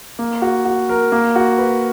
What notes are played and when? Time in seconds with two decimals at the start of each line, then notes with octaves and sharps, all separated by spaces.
0.19 A#3
0.42 F#4
0.65 F#4
0.89 A#4
1.12 A#3
1.35 F#4
1.59 B4